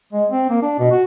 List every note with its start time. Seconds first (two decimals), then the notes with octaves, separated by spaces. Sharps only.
0.13 G#3
0.30 C4
0.50 A#3
0.62 D4
0.79 B2
0.91 F#4